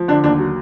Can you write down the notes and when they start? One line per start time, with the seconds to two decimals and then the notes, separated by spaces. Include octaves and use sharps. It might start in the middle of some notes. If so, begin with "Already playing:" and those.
Already playing: F3
0.08 D3 D4
0.24 D#2 D4
0.39 F#3